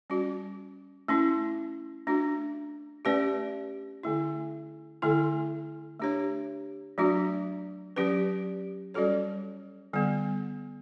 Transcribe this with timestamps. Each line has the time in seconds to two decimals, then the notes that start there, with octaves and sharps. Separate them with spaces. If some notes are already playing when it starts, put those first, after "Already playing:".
0.10 G3 C#4 F#4
1.08 A3 C#4 E4
2.07 A3 D4 F#4
3.05 A3 C#4 G4 B4 D5
4.03 D3 A3 E4
5.02 D3 A3 E4 A4
6.00 A3 D4 G4 C#5
6.98 F#3 A3 D4 F#4
7.96 F#3 C#4 G4 B4 D5
8.94 G3 C#4 F#4 A4 C#5
9.93 D3 G3 B3